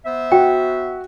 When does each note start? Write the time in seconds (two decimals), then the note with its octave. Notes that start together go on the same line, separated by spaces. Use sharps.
0.06 B3 C5 E5
0.32 F#4 G5